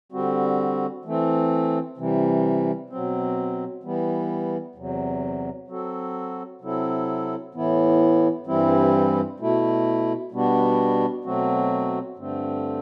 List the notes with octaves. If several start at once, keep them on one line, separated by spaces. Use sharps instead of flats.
D3 G3 C4 F#4
E3 A3 C4
C3 E3 G3
B2 F#3 C4
E3 G3 B3
E2 C3 F#3
F#3 C4 F#4 A4
C3 F#3 C4 E4 A4
A2 E3 B3 E4
G2 E3 G3 C4 E4
B2 A3 E4
B2 G3 B3 D4 F#4
B2 F#3 A3 C4 F#4
G2 D3 A3 C4